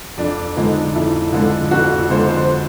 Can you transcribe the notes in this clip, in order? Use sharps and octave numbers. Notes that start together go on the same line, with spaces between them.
F2 D4
D3 F3 G#3 D#4
F2 E4
D3 F3 G#3 F4
F2 F#4
D3 F3 G#3 C5
C5